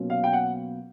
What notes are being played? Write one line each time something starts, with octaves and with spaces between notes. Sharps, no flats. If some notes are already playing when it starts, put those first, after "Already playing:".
Already playing: B2 F#3 A#3 C#4 F4
F5
G5
F#5